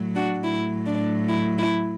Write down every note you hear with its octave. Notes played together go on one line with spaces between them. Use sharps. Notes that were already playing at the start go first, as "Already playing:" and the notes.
Already playing: A2 F#3
D4 F#4
A2 F#3 E4
D4
E4
E4